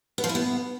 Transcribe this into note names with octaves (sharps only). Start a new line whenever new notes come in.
B3
F3
E4
B3